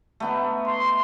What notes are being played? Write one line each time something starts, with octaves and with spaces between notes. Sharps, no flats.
A3 B3 D#4
C6